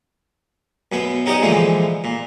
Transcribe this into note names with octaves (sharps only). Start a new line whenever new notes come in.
F#2 B2 B3
C#4 D#4 G4 D5 D#5 F#5
A#2 D3 E3 F3 G#3
A#2